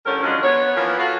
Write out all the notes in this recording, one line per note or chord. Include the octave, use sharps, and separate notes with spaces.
A2 D3 G3 C#4 A#4
D#3 F3 F#3 G#3 C#4 D4
B3 C#5
E3 F3 A#3 B3 A#4
F4 F#4 A4